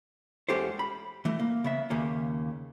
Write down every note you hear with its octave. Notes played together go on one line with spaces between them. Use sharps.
E2 G#3 C#4 G4 A4 C5
B5
E3 A3
A#3
C#3 B3 E5
D#2 C#3 A#3 C#4